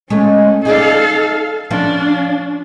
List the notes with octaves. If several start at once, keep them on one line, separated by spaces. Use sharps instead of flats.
G#3 A3 C#4
D#4 G#4 A4 D5 F5
F3 C#4 D4